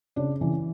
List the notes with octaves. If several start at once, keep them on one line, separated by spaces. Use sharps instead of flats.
C#3 D4
E3